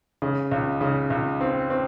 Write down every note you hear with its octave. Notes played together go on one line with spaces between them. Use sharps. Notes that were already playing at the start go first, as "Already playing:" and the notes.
C#3
C#2
C#3
C#2
C4
C4